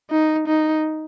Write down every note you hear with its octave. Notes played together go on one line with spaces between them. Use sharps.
D#4
D#4